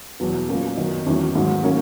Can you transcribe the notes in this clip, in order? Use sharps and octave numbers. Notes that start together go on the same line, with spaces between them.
E2 B2 F#3 B3
A#2 F#3 A#3 C#4
F#2 D#3 F#3 B3 D#4
E2 D#3 F#3 C#4 E4
G#2 D#3 F#3
D#3 F#3 A#3 C#4